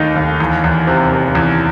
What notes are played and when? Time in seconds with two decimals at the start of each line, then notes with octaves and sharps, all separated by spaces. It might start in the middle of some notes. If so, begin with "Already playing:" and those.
Already playing: D#2 D#3 A3 D#4
0.16 D#2
0.40 E2
0.64 E2
0.87 C3
1.12 D#3
1.35 E2